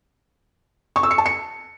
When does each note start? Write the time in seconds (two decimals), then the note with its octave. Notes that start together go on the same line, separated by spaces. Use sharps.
0.96 C#6
1.03 E6
1.11 C#7
1.18 A5
1.26 C#7